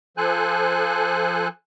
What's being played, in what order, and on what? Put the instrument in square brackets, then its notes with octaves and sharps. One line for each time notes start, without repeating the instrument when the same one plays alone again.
[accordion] F3 A4 C5 G#5 F#6